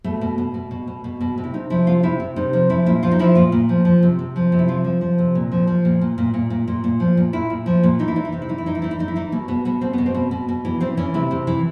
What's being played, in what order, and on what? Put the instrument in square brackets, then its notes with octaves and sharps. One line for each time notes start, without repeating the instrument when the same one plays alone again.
[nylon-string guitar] B2 A3
B2
B2
B2
B2
B2
B2
B2
C3
E4
C3 D#4
F3 E4
C3 F4
C3 E4
C3
C3 D#4
F3
F3 E4
A#2 E4
F3 F4
D#4
F3 E4
A#2 F4
A#2
F3
F3
C3
C3
F3
C3
E4
F3 F4
F3
F3
C3
A#2
F3
F3
A#2
A#2
A#2
A#2
A#2
A#2
A#2
F3
A#2
A#2 E4
A#2
F3
A#2
E3 D#4
E4
E3 D#4
E4
C3 D#4
E4
E3 D#4
E4
E3 D#4
E4
E3 D#4
E4
E3 D#4
E4
E3 D#4
B2 A#3
B2 B3
B2 B3
B2 C4
B2 B3
C4
B2
B2
B2
E3 B3
E3 C4
E3 C#4
C3 E4
C3
E3